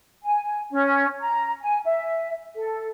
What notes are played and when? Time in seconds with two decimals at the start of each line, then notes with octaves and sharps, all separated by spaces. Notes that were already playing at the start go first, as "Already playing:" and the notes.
0.24 G#5
0.70 C#4
1.21 A#5
1.62 G#5
1.86 E5
2.56 A4